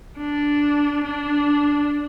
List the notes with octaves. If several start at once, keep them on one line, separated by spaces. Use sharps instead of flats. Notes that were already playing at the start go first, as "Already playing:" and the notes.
D4
D4